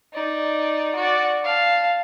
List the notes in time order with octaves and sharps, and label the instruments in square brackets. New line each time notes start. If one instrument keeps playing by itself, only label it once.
[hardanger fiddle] D#4 D5
F#4 D5
F5 A5